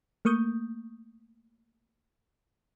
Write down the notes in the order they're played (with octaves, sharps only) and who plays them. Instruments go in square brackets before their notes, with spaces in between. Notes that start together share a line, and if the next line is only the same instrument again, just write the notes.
[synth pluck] A3 A#3 C#6 D#6 G6